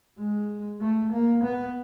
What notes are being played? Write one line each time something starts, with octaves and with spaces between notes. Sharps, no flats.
G#3
A3
A#3
B3